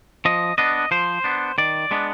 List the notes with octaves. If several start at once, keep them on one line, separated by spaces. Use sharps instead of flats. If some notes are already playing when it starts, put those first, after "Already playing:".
F3 D#5
B3 D4 D#5
F3 C5
B3 D4
D#3 D5
G#3 B3 D4